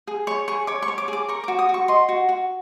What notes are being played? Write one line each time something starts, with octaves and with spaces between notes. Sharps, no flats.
G#4
C#5 C#6
G#4 C#6
C#5 D6
C#6
C#5
D6
G#4
D6
A#4 C#6
D6
F#4
D#6
F#4
C#6
D#5 C6
F#4
F#4